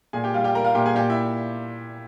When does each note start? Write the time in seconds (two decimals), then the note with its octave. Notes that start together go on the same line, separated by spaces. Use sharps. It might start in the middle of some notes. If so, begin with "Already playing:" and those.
0.13 A#2 G#4 G#5
0.24 G4 G5
0.34 G3 F4 F5
0.44 G4 G5
0.55 G3 A#4 A#5
0.64 F4 F5
0.75 A#2 G4 G5
0.86 G#4 G#5
0.95 A#2 G4 G5
1.09 E4 E5